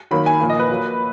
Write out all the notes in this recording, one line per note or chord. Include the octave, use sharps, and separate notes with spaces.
D#3 F#3 A#3 B5
G#5
A#2 F3 A#3
D#5
B4
A#2 F#3 A#3